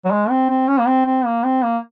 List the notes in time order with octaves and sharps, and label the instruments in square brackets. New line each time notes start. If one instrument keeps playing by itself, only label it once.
[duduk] F#3
G#3
C4
C4
C#4
A#3
C4
C4
A#3
C4
A#3